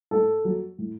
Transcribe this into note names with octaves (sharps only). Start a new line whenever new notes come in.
A2 A4
F#3
A2